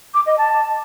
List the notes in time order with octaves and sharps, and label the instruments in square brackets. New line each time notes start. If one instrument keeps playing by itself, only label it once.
[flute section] D6
D#5
A5